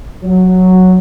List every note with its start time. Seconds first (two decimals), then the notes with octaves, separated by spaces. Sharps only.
0.24 F#3